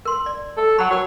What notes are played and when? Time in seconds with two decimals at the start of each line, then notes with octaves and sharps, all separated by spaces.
0.05 A#4 C6
0.26 D5
0.57 A4
0.79 F#3 F#5 B5
0.91 F#4 A#4 C#5 G5